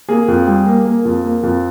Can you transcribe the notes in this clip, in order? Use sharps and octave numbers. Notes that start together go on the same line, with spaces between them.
A#3 G#4
F2
G3
A#3
A#3
F2
A#3
F2